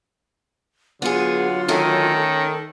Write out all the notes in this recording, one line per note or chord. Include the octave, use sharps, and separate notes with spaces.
D3 F#3 B3 F4 G#4 F#5
D#3 A3 C#4 A4